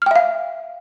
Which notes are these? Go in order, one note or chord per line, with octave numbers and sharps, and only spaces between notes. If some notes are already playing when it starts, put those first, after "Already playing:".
E5 F5 G5 F6